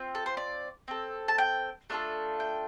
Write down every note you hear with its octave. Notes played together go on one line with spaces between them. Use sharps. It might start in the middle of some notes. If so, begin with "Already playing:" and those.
Already playing: C4 F4
A4
C5
D5
C4 A4
A5
G5
A3 D4 F4 A4
G5